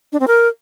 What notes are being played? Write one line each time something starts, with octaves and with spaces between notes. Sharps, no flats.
D4
C4
A#4